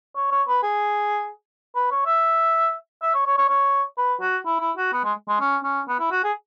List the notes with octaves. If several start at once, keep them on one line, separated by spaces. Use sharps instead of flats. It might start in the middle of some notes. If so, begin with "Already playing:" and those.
C#5
C#5
B4
G#4
B4
C#5
E5
E5
C#5
C#5
C#5
C#5
B4
F#4
E4
E4
F#4
B3
G#3
G#3
C#4
C#4
B3
E4
F#4
G#4